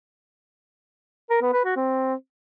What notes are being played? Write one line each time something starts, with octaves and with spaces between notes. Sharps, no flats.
A#4
B3
B4
F#4
C4